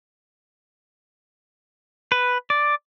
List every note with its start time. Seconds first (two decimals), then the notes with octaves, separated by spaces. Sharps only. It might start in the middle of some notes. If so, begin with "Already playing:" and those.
2.12 B4
2.50 D5